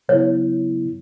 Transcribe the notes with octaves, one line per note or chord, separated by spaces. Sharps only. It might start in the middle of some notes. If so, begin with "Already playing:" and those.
C#3 F#3 B3 E4 C#5